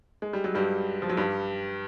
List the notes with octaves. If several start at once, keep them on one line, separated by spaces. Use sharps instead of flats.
G#3
G3
F#3
G2 G3
F3
F#3
G2 G3